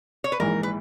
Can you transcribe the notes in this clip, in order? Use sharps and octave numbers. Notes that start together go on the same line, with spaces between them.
C#5
B4
A#1 G#2 E3 A#4
B4